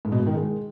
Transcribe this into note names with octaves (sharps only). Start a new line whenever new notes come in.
G#2
B2
G#2
D#3
G#3